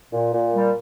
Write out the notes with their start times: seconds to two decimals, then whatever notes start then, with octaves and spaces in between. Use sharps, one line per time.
0.13 A#2
0.34 A#2
0.53 G3